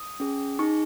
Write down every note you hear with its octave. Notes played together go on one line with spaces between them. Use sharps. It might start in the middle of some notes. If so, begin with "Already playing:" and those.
Already playing: D#6
C#4 G#4
D#4 G#4 C#6